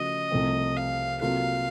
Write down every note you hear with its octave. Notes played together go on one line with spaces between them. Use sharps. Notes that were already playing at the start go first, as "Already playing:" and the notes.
Already playing: C#3 F3 A3 F#4 D#5
C2 C3 F3 A3 C4
F5
C3 F#3 A#3 F4 A4 F5